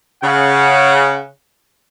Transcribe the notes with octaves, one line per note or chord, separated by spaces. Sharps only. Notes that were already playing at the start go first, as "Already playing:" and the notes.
C#3 F#5